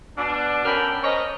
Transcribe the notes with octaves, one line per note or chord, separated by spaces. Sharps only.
B2 D4
D3 C#4 A#4 G5 B5
A#4 C5 C#5 D#5